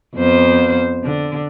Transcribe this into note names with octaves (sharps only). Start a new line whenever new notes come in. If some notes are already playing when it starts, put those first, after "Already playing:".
F2 B3 C5
D3